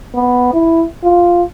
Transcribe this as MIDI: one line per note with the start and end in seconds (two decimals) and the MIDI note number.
0.15 0.51 59
0.53 0.84 64
1.03 1.43 65